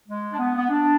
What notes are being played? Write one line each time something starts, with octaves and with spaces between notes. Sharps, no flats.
G#3
D4
B3
B3
D4